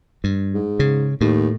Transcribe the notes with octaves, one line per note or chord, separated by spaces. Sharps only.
G2
G#2
C#3
D#2 A2